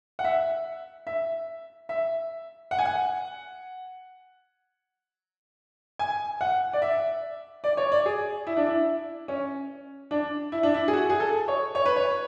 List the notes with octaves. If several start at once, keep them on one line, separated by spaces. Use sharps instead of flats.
F#5
E5
E5
E5
F#5
G#5
F#5
G#5
F#5
D5
E5
D5
C#5
D5
G#4
E4
D4
E4
C#4
D4
E4
D4
E4
G#4
F#4
G#4
A4
C#5
C#5
B4
C#5